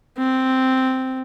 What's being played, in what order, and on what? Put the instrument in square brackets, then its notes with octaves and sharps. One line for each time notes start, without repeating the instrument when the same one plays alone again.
[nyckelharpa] C4